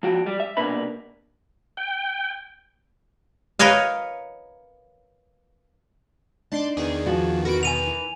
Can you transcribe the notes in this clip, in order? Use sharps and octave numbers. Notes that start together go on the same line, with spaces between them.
F3 F#4 G5
G3
E5
C2 B2 A#3 D4 B4 B5
G5
A#4 B4 C#5 D#5 F5
D4 D#4 A5 C6 D6
E2 D#3 G#4
F3 F#4
F#4 A#4 B4 D7
B2 G#5 D#7 F7
E3